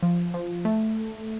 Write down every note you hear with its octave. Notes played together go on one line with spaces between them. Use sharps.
F3
F3
A3